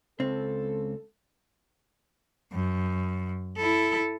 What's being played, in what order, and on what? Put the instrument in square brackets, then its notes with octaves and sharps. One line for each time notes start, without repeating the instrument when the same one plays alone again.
[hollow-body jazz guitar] C#2 C4 [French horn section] A4
[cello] F#2
E4 A4